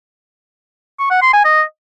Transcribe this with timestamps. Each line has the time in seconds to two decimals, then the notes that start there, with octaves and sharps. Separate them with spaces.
0.99 C#6
1.10 F#5
1.22 C6
1.33 G#5
1.45 D#5